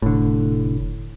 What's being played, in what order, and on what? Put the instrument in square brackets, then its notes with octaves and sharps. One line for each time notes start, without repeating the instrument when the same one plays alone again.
[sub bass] F1 [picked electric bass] A2 D3